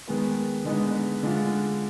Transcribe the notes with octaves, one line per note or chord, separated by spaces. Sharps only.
D#3 G#3 B3
D3 G#3 B3 D#4
D3 G#3 D4 F4